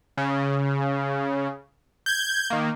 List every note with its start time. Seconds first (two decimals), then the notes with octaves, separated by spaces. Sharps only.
0.18 C#3
2.06 G6 G#6
2.50 D#3 A#3